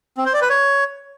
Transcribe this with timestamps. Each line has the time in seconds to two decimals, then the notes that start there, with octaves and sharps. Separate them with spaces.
0.18 C4
0.26 C5
0.34 D5
0.42 B4
0.50 C#5